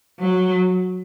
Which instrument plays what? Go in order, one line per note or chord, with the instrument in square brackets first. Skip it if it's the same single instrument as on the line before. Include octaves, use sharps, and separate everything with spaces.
[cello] F#3